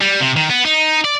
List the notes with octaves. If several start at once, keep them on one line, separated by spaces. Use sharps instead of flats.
G3
C3
D#3
B3
D#4
D5